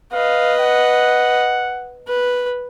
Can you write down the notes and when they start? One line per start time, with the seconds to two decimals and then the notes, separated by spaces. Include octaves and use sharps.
0.13 B4 D#5 F5
0.60 F#5
2.08 B4